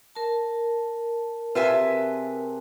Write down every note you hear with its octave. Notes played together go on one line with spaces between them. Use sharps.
A#4 A5
C3 F4 G#4 B4 E5 F#5 G#5